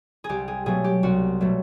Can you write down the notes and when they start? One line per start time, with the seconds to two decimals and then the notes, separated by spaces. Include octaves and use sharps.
0.24 G#4
0.29 C2 G4
0.48 G#4
0.66 B2 F#3 A3 G#4
0.84 G4
1.03 C2 F#4
1.41 B2 F#3 A3